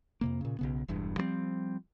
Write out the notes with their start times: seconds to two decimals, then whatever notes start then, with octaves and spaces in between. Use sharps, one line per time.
0.21 F2 C3 A#3
0.41 A#2 C#3
0.59 B1 C#3 B3
0.88 E1 E2 G2
1.16 F3 G3 G#3 C4